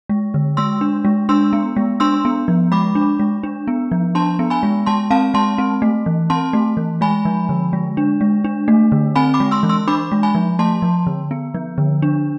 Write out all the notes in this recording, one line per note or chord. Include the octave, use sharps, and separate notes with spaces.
G#3
D3
G#3 C6 E6
D4
G#3
D4 C6 E6
B3
G#3
D4 C6 E6
B3
F3
G#3 B5 D6
D4
G#3
D4
B3
F3
D4 A5 C6
B3
G#5 B5
G#3
G#3 A5 C6
C4 F5 A5
G#3 A5 C6
C4
A3
E3
C4 A5 C6
A3
E3
G#3 G#5 B5
F3
D3
G#3
D4
G#3
D4
A3
D3
C4 G#5 B5
B5 D6
G#3
C6 E6
E3
C6 E6
D4 B5 D6
G#3
G#5 B5
F3
A3 A5 C6
F3
D3
B3
F3
D3
D4